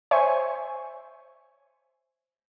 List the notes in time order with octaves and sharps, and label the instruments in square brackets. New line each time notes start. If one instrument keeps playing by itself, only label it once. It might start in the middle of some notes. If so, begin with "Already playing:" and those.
[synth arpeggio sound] C5 C#5 E5 G#5 C#6